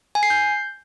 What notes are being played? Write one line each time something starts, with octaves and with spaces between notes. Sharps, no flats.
G#5
C7
G6